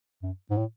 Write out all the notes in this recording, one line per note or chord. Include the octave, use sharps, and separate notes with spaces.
F#2
G#2
A2